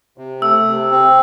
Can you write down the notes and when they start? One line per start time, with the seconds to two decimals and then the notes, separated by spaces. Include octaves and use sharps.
0.18 C3
0.42 A3 E6
0.66 C3
0.91 C4